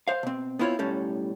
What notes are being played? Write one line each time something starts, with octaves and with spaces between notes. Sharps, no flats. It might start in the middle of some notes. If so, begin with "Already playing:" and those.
C5 F5
B2 C4
B3 C4 E4 F4 C5 C#5
B1 A2 G3 C#4 A4